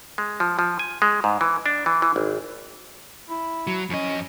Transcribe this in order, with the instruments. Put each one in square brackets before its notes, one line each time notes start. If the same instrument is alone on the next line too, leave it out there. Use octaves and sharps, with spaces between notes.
[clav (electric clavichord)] G#3
F3
F3
G#5
G#3
G#2
E3
D4
E3
E3
G#1
[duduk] E4
[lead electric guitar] F#3
[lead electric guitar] F2 D#5 [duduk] C#4